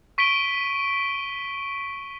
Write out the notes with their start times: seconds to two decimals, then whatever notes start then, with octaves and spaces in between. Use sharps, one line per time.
0.18 C#6 B6 D7 D#7 G7